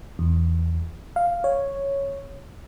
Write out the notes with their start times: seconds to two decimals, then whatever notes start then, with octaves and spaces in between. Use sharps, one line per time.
0.19 E2
1.16 F5
1.44 C#5